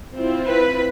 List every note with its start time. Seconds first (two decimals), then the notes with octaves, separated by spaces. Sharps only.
0.16 C4 E4 F4
0.48 B4